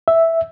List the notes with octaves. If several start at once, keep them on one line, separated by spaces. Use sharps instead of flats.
E5